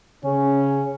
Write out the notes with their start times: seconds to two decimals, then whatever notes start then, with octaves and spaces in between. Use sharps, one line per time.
0.24 C#3 C#4